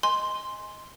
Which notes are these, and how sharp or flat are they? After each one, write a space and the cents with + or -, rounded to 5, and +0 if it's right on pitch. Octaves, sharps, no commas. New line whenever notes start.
D#5 +0 G#5 +0 C6 +0